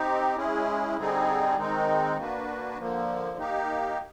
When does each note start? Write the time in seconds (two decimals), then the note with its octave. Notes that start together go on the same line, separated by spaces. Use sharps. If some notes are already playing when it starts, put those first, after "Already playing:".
Already playing: C4 D#4 G4
0.36 G#3 C#4 E4 G#4
0.96 D3 G3 C4 D#4 G#4
1.57 D#3 G#3 C4 D#4
2.17 A#3 D4 F#4 B4
2.77 D3 F3 A#3
3.38 A#3 D#4 G4